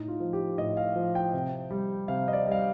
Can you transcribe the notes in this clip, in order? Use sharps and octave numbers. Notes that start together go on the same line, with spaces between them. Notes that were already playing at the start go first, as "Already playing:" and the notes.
Already playing: A2 D#4
F4
F3
G4
A2 D#5
F5
F3
G5
C3
G3
C3 F5
D#5
D5
G3 F5